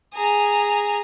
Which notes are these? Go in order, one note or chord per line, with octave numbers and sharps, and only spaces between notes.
G#4 A#5